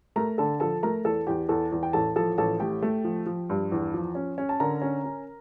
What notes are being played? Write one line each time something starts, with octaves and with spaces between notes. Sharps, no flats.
A3 A#4 A#5
D3 A4 A5
F3 A4 A5
A3 A#4 A#5
E2 A4 A5
E2 G4 G5
E2 A4 A5
E2
G5
A1 A4 A5
F3 A4 A5
A1 A4 A5
A3 G4 G5
A3
F3
F3
G2
E2
F3
C#4
C#4
A5
D3 A#4 A#5
C#4
C#4